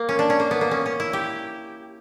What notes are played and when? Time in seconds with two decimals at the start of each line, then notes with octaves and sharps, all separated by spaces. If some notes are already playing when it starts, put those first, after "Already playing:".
Already playing: A#3
0.09 C#4
0.19 D4
0.30 C#4
0.40 A#3
0.51 B3
0.61 A#3
0.71 C#4
0.86 C#4
1.00 E4
1.13 G4